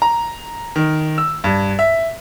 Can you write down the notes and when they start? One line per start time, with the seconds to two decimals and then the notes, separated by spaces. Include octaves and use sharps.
0.02 A#5
0.76 D#3
1.18 E6
1.44 G2
1.79 E5